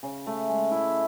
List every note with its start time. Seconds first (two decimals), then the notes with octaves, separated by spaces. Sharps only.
0.03 C#3
0.27 A3
0.49 G#3
0.71 E4